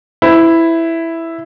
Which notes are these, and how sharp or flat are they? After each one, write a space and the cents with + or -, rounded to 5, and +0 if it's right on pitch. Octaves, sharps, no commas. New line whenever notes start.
E4 +0 C5 -45